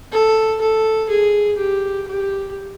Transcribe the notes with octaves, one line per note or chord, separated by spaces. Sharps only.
A4
A4
G#4
G4
G4